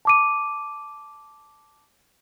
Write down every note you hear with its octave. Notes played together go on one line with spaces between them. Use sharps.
A5 D6 D#7